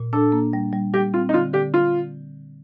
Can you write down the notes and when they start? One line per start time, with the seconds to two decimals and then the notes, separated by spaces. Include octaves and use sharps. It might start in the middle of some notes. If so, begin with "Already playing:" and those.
Already playing: A#2
0.13 D4 A4
0.32 A#3
0.53 G3
0.73 G3
0.93 G3 G4
1.14 C4 F4
1.29 D#4
1.33 D3 F4
1.54 D3 G4
1.74 G3 F4